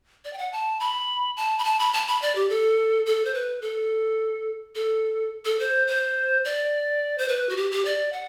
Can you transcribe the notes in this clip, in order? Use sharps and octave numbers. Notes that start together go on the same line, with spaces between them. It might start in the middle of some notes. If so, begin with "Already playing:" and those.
D5
G5
F#5
A5
B5
A5
B5
A5
B5
A5
B5
D5
G4
A4
A4
C5
B4
A4
A4
A4
C5
C5
D5
C5
B4
F#4
G4
G4
D5
F#5